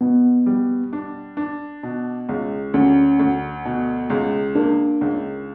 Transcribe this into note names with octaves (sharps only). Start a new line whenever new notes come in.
B2 B3
G3
D4
D4
B2
C#2
D2 C#4
D2
B2
C#2
A#3 D4
C#2